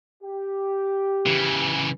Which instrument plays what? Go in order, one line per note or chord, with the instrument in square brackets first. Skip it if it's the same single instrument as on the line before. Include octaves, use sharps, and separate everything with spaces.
[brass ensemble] G4
[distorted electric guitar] C#3 E3